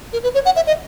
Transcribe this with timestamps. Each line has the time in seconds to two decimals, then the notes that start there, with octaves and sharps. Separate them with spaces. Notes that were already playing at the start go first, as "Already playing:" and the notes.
0.13 A#4
0.24 B4
0.34 C#5
0.45 F#5
0.56 E5
0.67 D#5